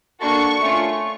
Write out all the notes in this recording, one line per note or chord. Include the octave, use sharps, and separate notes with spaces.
A#3 D4 F#4 A4 C#6
A3 C#4 F4